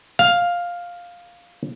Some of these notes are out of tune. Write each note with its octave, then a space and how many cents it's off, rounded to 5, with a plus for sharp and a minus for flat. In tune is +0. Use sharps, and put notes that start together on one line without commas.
F5 +5